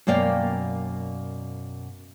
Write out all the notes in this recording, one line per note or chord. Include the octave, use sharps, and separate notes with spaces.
F#2 B2 A#3 D5 F5 G5